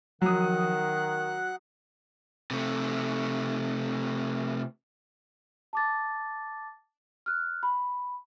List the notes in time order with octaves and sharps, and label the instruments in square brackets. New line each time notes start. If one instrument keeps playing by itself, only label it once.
[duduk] D#3 [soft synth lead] F3 [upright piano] F#3 D#6 [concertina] F#5
[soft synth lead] F#6
[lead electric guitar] C3 A3
[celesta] A5 D6 A6
F6 F#6
B5